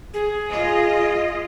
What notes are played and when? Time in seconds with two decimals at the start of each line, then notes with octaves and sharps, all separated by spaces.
0.14 G#4
0.49 F4 D#5